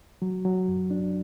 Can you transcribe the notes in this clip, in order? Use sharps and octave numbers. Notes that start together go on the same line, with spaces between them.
F#3
F#3
F#2
D4